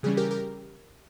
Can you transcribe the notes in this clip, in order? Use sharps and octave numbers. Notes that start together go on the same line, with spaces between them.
C#3 E3 G3 C#4 G#4
G4 A#4
G4 A#4